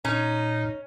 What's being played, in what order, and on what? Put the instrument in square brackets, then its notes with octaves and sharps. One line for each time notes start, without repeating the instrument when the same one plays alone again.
[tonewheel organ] A#2 [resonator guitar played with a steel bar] C#4 [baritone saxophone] D#4